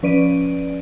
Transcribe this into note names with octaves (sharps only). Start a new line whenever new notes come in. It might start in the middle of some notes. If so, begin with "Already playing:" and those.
F3 C#4 B4 D5 D7 D#7